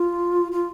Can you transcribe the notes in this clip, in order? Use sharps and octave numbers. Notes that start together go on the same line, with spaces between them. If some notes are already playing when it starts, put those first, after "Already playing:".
Already playing: F4
F4